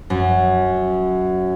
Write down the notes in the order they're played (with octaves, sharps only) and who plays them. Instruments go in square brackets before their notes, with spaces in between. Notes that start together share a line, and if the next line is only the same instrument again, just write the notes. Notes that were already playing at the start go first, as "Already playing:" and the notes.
[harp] F#2